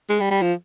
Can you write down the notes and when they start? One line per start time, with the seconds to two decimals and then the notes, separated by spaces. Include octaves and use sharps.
0.09 G#3
0.20 G3
0.31 G3
0.42 F3